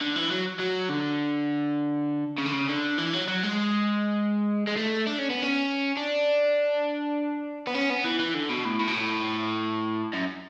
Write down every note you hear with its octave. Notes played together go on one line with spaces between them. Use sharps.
D3
E3
F#3
F#3
D3
C#3
D3
C#3
D3
E3
F#3
F#3
G#3
G#3
A3
D4
C#4
B3
C#4
D4
B3
C#4
B3
E3
E3
D3
B2
A2
A2
B2
A2
F#2